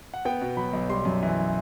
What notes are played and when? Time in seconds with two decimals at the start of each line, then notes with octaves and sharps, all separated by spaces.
0.14 F#5
0.25 B3 G5
0.41 B2
0.57 F#3 B5
0.73 B1
0.89 G3 C6
1.05 F#2
1.23 E3